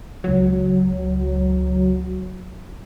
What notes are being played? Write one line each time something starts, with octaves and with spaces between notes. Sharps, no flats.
C#2 F#3